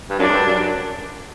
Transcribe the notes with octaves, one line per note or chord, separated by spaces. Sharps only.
G2
F#2 D4
G#2
G2
F#2
F#2